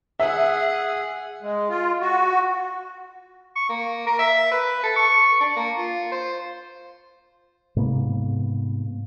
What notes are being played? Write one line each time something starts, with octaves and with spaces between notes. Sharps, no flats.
G#4 E5 F#5
G#3
F4
F#4
C#6
A#3
A#4
E5
B4
A4
C#6
D4
A#3
F4
C5
G#2 C3 A#3 B3